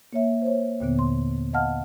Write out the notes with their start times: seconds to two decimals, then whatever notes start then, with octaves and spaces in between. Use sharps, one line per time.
0.13 A#3 C#5 E5
0.42 C5 C#5
0.80 D#2 A#2 D3 B3
0.99 C6
1.53 D#5 F5 F#5 A5 F6